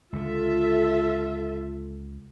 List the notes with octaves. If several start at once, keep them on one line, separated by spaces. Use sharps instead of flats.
C#2 D3 F4 A4 E5